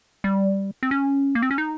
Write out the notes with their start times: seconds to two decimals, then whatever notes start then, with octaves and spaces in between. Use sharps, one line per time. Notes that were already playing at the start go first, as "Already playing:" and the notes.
0.24 G3
0.83 C4
0.91 C#4
1.35 A#3
1.42 C4
1.51 C#4
1.58 D#4